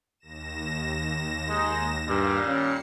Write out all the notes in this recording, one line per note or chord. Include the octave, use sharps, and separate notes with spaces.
D#2 A#6 E7
G#3 D#4
G2 A#2 G3 F5
C#4 C7 C#7